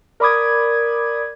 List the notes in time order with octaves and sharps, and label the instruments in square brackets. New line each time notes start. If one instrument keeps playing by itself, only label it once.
[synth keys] A#4 D5 B5 D6 D#6 G#6